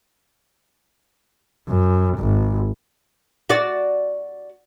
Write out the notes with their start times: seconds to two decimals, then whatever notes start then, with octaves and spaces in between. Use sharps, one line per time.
1.69 F#2
2.18 G#1
3.49 F#4 D5